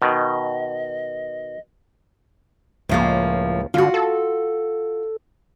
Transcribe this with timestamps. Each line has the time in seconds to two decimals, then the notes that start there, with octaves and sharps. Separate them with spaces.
0.02 B2 D#3 D#5
2.89 C#2 A2 F3 A#3
3.74 D3 F4 F#4
3.94 A4